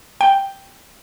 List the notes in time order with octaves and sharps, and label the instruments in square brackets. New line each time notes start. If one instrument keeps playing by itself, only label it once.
[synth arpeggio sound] G5